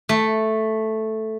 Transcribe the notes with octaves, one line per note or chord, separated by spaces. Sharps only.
A3